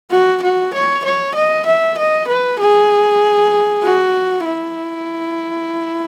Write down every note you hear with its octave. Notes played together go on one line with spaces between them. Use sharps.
F#4
F#4
C#5
C#5
D#5
E5
D#5
B4
G#4
F#4
E4